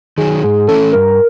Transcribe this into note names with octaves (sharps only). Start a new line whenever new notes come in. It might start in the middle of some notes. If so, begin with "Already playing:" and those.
D#3 F#3 G#4
G#2 G#4
E3 A3 C#4 E4 A4
G2 A#4